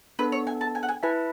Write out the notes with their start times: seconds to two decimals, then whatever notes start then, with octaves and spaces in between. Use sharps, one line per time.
0.19 B3 D4 A4 B4
0.32 C#5
0.47 G#5
0.61 A5
0.75 G#5
0.83 F#5
0.89 G#5
1.03 E4 B4 E5 G#5 A5